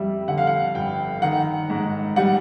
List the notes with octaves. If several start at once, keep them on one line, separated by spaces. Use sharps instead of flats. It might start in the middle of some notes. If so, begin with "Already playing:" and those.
Already playing: F2 G3 E5
D3 F#5
F5
F#5
G1 G5
D#3 F#5
G#2
G3 F#5